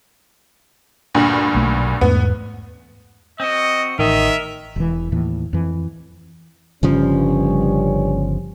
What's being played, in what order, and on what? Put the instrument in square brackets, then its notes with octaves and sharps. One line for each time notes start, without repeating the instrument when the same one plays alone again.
[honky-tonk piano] D2 G2 A#2
[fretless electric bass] B1 A3
[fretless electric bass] E2 G#2 A3 [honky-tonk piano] B3
[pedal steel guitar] C4 F#4 [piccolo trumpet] D#5
[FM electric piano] A1 [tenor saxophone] D#3 [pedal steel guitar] A#4 D#5 [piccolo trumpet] E5
[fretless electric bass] E1 E3
D#2 A2 E3
F2 E3
[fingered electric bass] G1 C#3 F3 [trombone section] G2 G3 C#4